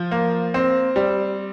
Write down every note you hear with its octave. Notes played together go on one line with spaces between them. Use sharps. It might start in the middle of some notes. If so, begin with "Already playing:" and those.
Already playing: F3
A#3
C4
G3